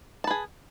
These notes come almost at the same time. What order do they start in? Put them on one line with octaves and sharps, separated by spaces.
A5 B4 G#4